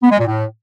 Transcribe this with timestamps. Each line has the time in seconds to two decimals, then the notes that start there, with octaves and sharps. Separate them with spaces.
0.03 B3
0.11 G#3
0.19 A#2
0.27 A2